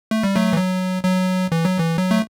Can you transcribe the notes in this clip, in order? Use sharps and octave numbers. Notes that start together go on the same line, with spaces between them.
A3
G3
F#3 A3
E3
F#3
F#3
E3
F#3
E3
F#3
A3